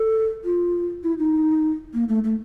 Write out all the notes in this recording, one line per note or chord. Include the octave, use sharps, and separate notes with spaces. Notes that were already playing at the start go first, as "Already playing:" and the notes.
Already playing: A4
F4
E4
D#4
A#3
A3
A3